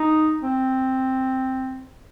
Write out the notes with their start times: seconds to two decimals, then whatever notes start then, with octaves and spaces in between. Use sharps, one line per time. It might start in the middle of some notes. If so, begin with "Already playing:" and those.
Already playing: D#4
0.43 C4